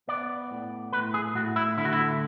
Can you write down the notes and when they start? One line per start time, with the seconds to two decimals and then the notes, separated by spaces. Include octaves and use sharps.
0.08 B3 D5
0.51 A2
0.93 A2 B4
1.14 G#4
1.35 A2 F#4
1.56 E4
1.78 D3 E4
1.85 F#4
1.93 E4